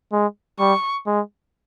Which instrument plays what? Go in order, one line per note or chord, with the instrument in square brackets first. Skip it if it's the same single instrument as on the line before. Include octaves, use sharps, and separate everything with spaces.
[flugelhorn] G#3
[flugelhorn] G3 [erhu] C#6
[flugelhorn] G#3